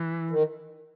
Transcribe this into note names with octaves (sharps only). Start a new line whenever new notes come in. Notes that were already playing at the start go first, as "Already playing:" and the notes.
Already playing: E3
D#3